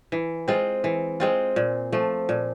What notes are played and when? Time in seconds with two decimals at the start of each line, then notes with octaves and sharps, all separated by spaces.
0.12 E3
0.48 G#3 C4 F4
0.84 E3
1.20 G#3 C4 F4
1.56 A#2
1.92 F3 A3
2.29 A#2